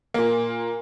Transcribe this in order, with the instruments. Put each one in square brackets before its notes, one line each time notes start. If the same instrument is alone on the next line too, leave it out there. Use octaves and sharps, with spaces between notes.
[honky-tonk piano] A#2 A#3